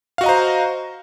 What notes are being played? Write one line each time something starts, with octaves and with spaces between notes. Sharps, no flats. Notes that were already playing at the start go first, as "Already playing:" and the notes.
F#4 C5 D#5 F5 A#5